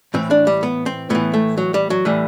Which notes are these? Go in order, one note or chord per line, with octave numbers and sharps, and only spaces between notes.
A2 E3 C4
D4
G3
B3
C4
A2 E3 B3
A3
F#3
G3
F#3
A2 E3 G3